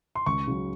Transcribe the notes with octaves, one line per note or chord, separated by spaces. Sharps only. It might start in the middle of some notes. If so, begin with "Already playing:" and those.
C6
C#2 C#6
C#3 F#3